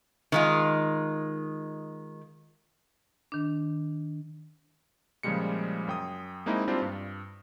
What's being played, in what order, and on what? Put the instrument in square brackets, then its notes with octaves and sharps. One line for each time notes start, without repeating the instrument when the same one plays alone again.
[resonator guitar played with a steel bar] D#3 G#3 F4
[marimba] D#3 D4
[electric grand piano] A#2 C#3 F3 G3 G#3 C#7
F#2 G5 D#6
G#3 A#3 C4 D#4 E4
G3 C4 D4 E4 F4 G4
G2